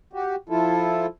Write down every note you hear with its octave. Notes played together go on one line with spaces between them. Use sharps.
F#4 G4
F3 E4 F4 A4